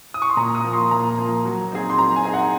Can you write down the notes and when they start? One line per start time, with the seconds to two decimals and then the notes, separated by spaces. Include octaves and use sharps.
0.14 D#6
0.22 C#6
0.29 C6
0.37 A#2 A#5
0.55 D#6
0.64 F3 A#3
0.73 C6
0.91 A#2 A#5
1.18 F3 A#3
1.45 F#3
1.72 C4 D#4 G#4
1.90 C6
1.98 F#3 A#5
2.16 G#5
2.25 C4 D#4 G#4
2.34 F#5